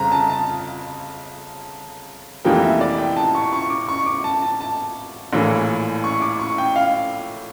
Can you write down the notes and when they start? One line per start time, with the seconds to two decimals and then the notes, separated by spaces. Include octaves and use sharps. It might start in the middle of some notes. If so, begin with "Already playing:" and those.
Already playing: G1 F2 C#3 F3 A#5
0.12 A5
0.30 A5
2.45 F1 F2 E3 G3 A#3 G5
2.62 E5
2.81 D5
2.98 G5
3.17 A5
3.35 C#6
3.53 C#6
3.70 D6
3.89 C#6
4.06 D6
4.24 A5
4.42 A5
4.61 A5
5.33 A#1 A2 E3 A#3
6.04 C#6
6.22 D6
6.40 C#6
6.58 G5
6.76 F5